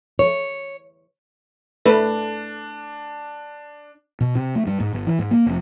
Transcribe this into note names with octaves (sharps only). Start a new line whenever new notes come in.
C#5
A3 D4 B4
B2
C3
A3
G2
G#2
G1
E3
G#2
A#3
F1